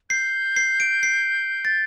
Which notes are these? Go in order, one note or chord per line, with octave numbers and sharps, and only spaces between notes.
G6 C7
C7
D7
C7
A6